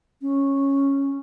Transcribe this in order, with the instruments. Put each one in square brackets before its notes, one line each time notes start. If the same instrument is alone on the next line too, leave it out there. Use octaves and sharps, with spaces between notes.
[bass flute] C#4